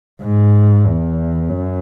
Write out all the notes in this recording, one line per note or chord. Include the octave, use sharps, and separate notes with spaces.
G#2
E2
F#2